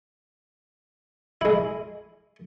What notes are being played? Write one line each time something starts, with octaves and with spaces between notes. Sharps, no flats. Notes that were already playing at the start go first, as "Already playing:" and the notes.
G#3 E4